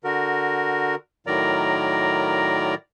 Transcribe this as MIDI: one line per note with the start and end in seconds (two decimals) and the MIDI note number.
0.04 0.95 50
0.04 0.95 66
0.04 0.95 70
1.27 2.75 45
1.27 2.75 51
1.27 2.75 54
1.27 2.75 70
1.27 2.75 74
1.27 2.75 82